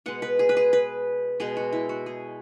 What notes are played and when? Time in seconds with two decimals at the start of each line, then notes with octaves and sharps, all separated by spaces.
0.06 B2 G#3 B3 F#5
0.22 B4
0.39 G#4
0.49 B4
0.57 G#4
0.73 B4
1.40 B2 G#3 B3 G#4
1.57 F#4
1.73 E4
1.89 F#4
2.06 G#4